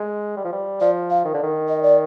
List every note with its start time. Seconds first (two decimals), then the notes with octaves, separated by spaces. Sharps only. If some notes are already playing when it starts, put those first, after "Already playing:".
Already playing: G#3
0.37 G3
0.44 F3
0.52 G3
0.80 F3 D5
1.10 F5
1.25 D#3
1.34 D3
1.43 D#3
1.69 D#5
1.83 D5